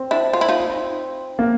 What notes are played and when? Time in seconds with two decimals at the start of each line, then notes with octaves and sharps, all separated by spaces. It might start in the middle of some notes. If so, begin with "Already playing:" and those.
Already playing: C4
0.11 D4 E4
0.33 F4
0.41 E4
0.49 D#4 F4
1.39 A#3